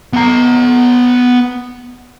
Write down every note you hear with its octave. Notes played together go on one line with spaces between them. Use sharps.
B3 A#5